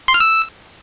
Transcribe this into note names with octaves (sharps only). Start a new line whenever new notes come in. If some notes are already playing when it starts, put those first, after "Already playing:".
C6
F6
E6